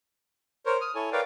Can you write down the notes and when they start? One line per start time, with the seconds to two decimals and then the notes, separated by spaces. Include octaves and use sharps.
0.66 A#4 C5 C#5
0.81 D#6 F6
0.95 E4 A4 C#5 G#5
1.12 A#4 B4 C#5 D5 F5 G5